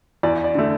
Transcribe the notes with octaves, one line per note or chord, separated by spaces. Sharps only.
E2 D5
D5
D3 A3